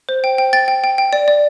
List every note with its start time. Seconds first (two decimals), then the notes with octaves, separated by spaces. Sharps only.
0.09 C5
0.24 G5
0.38 G5
0.53 G5 A6
0.68 G5
0.84 G5
0.98 G5
1.13 D5
1.28 D5